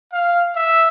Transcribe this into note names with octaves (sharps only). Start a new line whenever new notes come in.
F5
E5